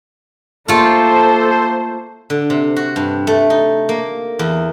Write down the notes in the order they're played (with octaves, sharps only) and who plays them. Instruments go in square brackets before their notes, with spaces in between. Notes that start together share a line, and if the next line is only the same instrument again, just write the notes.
[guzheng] A3 F4 [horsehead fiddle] A#3 [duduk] A4 [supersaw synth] C5
[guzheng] D3
C3
F#4
G2
A3
D#4
A#3
E2